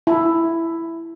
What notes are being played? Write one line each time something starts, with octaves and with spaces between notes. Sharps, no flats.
E4